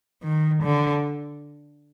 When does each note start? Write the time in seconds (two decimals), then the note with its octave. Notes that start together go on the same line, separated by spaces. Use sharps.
0.24 D#3
0.62 D3